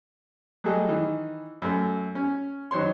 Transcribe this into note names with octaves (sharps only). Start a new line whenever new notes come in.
F#3 G3 A3 G#4 A4 D#5
D#3 E3
F#2 A3
C#4
D#3 F#3 C5 C#5 C6